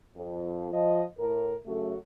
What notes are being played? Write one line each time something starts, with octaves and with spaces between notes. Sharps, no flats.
F2
F3 D#5
A2 A#4
F#2 C#3 F#3 A3 F#4 A4